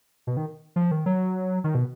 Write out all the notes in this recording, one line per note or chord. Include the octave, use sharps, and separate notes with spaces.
B2
D#3
F3
D#3
F#3
D#3
B2